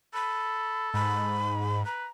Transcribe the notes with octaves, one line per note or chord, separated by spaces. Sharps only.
A4 B5
G#2 B5
B4 A#5